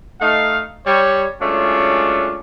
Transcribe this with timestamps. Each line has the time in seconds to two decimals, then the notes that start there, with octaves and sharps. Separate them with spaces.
0.21 A3 D#4 F5
0.86 G3 C#5
1.41 F#3 G#3 A3 C#4 D4 F4